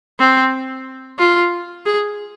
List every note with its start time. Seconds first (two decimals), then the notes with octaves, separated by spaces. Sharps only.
0.19 C4
1.19 F4
1.86 G#4